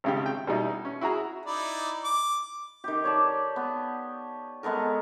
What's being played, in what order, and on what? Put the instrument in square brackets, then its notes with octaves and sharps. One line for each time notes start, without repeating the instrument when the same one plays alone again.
[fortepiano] G#1 C#3 G4
G5
B2 G3 D#4 E4
C#4
E4 F#4 G#4 A#5
[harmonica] D#4 E4 D5
D6
[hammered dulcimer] D#3 G4
C#5 D5 A5
B3
G#3 B3 A4 A#4